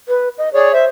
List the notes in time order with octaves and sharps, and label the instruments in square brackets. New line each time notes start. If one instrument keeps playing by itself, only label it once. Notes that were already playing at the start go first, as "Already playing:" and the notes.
[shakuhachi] B4
D#5
[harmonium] G#4 C#5 [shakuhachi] D5
[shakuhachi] C5 [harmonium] E5